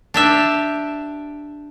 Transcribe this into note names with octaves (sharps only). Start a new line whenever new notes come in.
D4 G4 E5